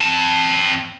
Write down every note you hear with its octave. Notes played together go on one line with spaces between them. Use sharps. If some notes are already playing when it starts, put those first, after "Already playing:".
C4 A5